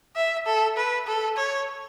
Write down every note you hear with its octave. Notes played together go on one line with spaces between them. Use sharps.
E5
A4
B4
A4
C#5